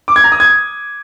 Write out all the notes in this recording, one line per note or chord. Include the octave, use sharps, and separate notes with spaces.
D6
G#6
A#5
D#6
G#6